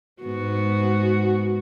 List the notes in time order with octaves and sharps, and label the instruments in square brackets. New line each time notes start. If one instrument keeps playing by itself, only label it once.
[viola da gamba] G#2 B3 F#4